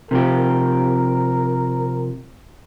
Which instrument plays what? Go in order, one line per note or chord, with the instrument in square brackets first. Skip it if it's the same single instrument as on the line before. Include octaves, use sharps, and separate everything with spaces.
[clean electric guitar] C3 F3 G4 [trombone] A#4